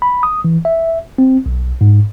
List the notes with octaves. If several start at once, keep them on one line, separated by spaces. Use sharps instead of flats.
B5
D#6
E3
E5
C4
B1
G#2